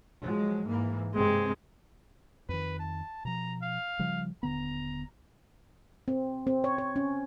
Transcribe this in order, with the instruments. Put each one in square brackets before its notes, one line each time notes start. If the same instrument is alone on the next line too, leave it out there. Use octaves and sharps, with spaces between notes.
[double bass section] F3 F#3 G#3
G#2 E3 A#3
[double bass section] G2 C3 C4 [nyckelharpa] G#3
[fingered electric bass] F2 D#3 [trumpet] B4
[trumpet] A5
[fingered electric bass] B2 F3 [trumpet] A#5
[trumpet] F5
[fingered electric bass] C#3 F3 G3
[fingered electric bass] D#1 D3 B3 [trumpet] A#5
[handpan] C4
C4
C#5
C#5
C#4